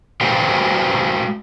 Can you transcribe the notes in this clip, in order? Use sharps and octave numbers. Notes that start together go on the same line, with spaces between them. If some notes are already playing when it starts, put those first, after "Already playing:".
G#3 F#4 B4 C5 F5 G5